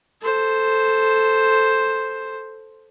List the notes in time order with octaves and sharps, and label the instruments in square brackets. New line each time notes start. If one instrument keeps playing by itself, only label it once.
[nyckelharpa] A4 C5